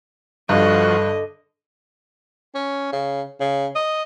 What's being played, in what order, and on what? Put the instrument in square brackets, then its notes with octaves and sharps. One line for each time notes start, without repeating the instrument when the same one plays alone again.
[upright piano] G2 [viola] D3 D#5 [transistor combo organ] F3 F#4
[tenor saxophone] C#4
C#3
C#3
D#5